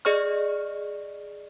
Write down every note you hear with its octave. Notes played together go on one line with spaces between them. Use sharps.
G#4 D5 D#5 C#6 F6